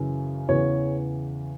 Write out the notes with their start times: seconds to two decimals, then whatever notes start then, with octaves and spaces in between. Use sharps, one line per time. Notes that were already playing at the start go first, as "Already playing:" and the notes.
Already playing: F#2 C#3 E3
0.48 E2 C#3 E3 C#5